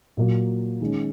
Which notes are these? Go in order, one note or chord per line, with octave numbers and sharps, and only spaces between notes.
A#2 F#3 A#3
D#3 G#3 C#4